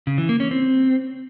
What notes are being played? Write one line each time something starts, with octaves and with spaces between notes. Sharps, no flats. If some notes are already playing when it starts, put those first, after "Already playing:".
C#3
E3
A#3
C#4
C4